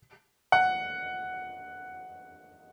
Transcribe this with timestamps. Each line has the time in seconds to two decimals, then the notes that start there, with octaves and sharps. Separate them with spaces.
0.52 F#5